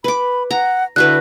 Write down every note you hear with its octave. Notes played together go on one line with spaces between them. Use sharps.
B4 B5 D6
F#5 A#5
D3 E4 F#4 B4 F#6